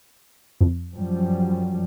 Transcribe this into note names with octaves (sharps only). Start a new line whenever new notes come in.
F2
F#2 F3 G3